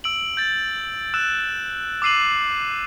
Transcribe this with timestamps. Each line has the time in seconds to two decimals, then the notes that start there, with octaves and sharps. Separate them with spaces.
0.04 E6 D7 F#7
0.37 G6 A6
1.14 E6 F#6 E7
2.02 D6 E6 C7 D#7 F#7